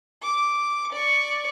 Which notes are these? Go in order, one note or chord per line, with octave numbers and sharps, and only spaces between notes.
D6
D5 C#6